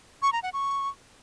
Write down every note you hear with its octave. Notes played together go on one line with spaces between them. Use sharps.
C#6
A#5
F#5
C#6